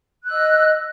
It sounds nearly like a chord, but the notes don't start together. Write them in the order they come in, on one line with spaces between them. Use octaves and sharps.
F#6 E6 D#5